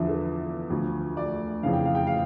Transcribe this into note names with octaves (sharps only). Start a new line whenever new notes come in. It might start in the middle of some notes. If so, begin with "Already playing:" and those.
Already playing: E2 D3 F3 E5
A4
D2 D3 F3
D5
F2 C#3 E3 F5
G5
F5
G5
F5